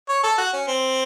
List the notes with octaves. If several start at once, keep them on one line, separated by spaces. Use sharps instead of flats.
C#5
A4
F#4
C#4
C4